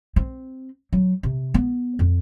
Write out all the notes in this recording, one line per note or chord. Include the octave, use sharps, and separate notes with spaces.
C4
F#3
C3
B3
F2